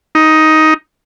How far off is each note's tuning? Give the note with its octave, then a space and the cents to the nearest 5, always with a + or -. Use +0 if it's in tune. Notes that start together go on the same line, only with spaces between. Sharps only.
D#4 +10